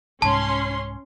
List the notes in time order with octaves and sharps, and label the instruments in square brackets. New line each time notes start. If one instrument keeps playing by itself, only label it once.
[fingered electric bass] C2 G#2 [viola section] C#4 C6 [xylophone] A5